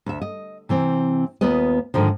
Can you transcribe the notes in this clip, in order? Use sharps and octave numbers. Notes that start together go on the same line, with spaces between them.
D2 E5
D#5
C3 E3 C4
D#2 B3 F4 B4 D#5
G#2 D3 D#3 F3